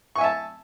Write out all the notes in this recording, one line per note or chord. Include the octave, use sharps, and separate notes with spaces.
E5 G#5 A5 C#6